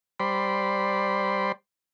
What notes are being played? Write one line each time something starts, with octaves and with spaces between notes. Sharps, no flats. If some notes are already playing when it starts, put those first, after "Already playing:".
G3 C5 D5 B5 C6